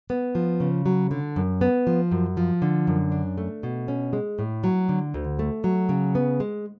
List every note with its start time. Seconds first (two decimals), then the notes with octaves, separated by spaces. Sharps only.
0.10 B3
0.35 F3
0.60 C#3
0.86 F#3
1.11 D3
1.36 F#2
1.61 B3
1.87 F3
2.11 F#2
2.37 F3
2.62 D3
2.87 F#2
3.12 D4
3.38 A3
3.63 B2
3.88 C#4
4.13 G#3
4.39 A2
4.64 F#3
4.89 D3
5.14 D2
5.39 A3
5.64 F#3
5.89 C#3
6.15 B3
6.40 G#3